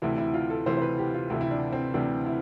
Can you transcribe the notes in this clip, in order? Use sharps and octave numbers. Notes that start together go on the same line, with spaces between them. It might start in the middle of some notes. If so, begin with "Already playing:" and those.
D2 C3 E3 E4
E4
F4
A4
D2 C3 E3 C5
C5
B4
G4
F4
D2 C3 E3 E4
E4
D4
C4
D2 C3 E3 D4
E4